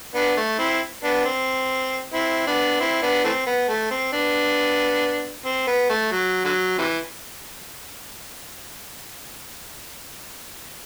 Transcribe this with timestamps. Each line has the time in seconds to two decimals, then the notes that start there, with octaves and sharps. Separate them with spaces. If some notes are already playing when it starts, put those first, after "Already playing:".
0.15 B3 D4
0.37 A3
0.59 C4 E4
1.04 B3 D4
1.25 C4
2.14 C4 E4
2.47 B3 D4
2.80 C4 E4
3.02 B3 D4
3.24 E3 A3 C4
3.47 B3
3.69 A3
3.91 C4
4.12 B3 D4
5.46 C4
5.67 B3
5.90 A3
6.12 F#3
6.44 D3 F#3
6.78 C3 E3